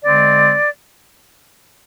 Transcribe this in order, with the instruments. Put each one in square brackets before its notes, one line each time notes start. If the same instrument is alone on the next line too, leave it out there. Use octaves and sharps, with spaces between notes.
[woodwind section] D3 G#3 C4 D5